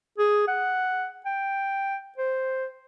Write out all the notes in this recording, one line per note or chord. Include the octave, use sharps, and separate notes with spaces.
G#4
F#5
G5
C5